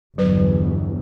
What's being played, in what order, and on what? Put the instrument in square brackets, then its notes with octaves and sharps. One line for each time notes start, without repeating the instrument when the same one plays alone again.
[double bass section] G1 E2 [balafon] F#3 B4